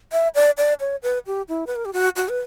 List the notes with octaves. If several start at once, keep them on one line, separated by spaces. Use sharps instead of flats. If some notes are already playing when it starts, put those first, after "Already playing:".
E5
D5
D5
C#5
B4
G4
E4
B4
A#4
G4
F#4
F#4
B4